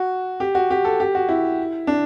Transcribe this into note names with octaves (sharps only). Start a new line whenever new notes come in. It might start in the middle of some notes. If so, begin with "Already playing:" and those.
Already playing: F#4
G4
F#4
G4
A4
G4
F#4
E4
D4